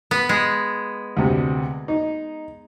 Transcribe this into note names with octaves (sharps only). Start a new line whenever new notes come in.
B3
G#3
D2 C3
D#4